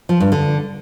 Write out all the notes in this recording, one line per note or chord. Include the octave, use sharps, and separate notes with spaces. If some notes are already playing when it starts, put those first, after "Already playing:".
F3
G2
D3